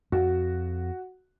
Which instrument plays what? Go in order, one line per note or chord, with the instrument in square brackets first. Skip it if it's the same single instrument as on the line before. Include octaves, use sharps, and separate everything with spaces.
[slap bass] F2 [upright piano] F#4